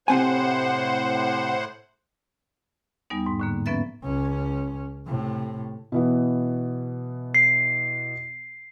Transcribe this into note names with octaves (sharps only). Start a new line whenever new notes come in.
A2 C3 C4 C5 F#5 G#5
E2 G3 B3 D#4
G#2
A2 D3 A#3
F3 B3 C#4 B4 E5 A6
C#2 C#4
A2 C3
B2 E3 B3
C7